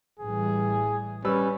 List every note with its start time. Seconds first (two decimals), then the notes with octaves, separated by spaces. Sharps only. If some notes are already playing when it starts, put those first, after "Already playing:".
0.19 A1 E3 G3 G#4
1.25 G3 C#4 B4 E6